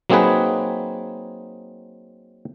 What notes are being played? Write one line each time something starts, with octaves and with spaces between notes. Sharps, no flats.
F#3 A#3 C4 D#4 G#4 B4